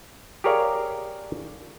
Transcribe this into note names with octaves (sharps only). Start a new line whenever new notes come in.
G4 G#4 A#4 C#5 D5 F5